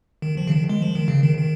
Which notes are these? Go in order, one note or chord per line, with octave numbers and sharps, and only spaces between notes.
D#3
F3
C#3
D#3
G#3
F3
D#3
C#3
D#3
D#3